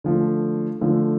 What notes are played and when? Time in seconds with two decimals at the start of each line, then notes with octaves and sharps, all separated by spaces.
0.04 D3 F3 A3
0.81 D3 F3 A3